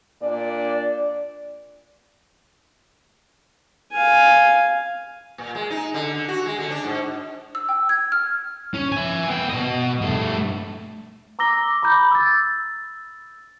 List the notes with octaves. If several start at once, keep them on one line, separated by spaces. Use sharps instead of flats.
A#2 D4 D5
F5 G#5
A#2
G#3
D#4
D3
D3
F#4
G#3
D3
D4
G#2
E6
G5
G#6
F6
C#4
E5 G#5
B3 G5
B2 D#5
G2 A3
A#5 D6 E6 A#6 G7
A#5 B5 D6 G6
E6 A6